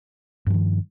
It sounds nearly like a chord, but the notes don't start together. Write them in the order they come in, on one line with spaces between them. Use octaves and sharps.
G2 F3 D#3